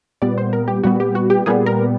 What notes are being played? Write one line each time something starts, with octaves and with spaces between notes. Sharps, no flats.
A#2 G3 B3 D5
C5
A#4
G4
A#2 G3 B3 F#4
G4
F#4
G4
A#2 G3 B3 G#4
A#4